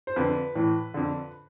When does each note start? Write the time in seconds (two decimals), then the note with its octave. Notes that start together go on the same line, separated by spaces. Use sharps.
0.07 C5
0.16 F2 D3 B4
0.55 A2 E3
0.94 F2 D3